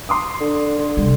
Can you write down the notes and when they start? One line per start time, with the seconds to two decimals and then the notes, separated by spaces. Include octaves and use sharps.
0.09 C6 D6 D#6
0.41 D3
0.78 D3
0.97 C3 G3